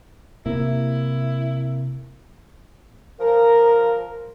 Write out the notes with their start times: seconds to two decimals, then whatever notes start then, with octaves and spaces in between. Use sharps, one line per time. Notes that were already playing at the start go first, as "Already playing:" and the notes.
0.46 C3 A#3 E4
3.19 F3 A#4